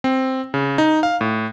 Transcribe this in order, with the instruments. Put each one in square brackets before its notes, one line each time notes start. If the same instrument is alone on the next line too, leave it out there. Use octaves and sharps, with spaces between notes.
[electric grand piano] C4
C#3
D#4
F5
A2